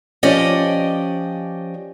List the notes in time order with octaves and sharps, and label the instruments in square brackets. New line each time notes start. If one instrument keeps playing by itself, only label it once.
[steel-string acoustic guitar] F3 C#4 G4 D5 D#5